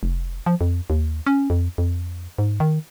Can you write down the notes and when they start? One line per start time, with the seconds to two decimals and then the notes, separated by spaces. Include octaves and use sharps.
0.03 F1
0.46 F3
0.61 F2
0.90 D#2
1.27 C#4
1.50 F2
1.78 F2
2.38 G#2
2.60 D#3